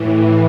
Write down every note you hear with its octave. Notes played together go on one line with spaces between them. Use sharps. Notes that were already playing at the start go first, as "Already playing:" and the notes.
Already playing: A2 E3